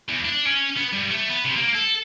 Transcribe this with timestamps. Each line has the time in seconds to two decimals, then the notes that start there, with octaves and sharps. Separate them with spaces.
0.08 E2
0.25 D4
0.46 C#4
0.77 B3
0.93 G2
1.10 A3
1.29 B3
1.44 C3
1.56 A#3
1.75 A4